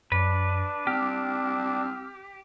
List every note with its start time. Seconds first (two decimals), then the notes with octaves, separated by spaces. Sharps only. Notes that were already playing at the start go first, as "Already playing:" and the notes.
0.12 F#2 D4 B4
0.87 C4 G4 F6